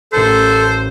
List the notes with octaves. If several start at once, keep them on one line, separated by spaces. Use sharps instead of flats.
A1 A4 A#4 C5 E6